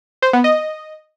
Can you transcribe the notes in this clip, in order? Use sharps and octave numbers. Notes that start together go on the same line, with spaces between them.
C5
B3
D#5